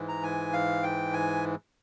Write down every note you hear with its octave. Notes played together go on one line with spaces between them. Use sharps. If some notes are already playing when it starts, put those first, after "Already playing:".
Already playing: G#2 E3
A#5
G#5
F5
G5
G#5